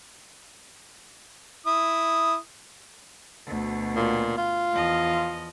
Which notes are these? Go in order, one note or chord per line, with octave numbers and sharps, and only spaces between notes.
E4 D#6
D2 B2
A#2
F4
E2 F3 D#5